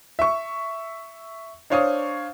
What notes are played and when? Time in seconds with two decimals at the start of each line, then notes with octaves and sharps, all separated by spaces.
0.19 E5 C#6
1.70 D4 C5 C#5 F5 C#6 D#6